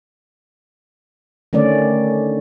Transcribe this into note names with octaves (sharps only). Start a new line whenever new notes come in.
D3 D#3 A3 C#4 D5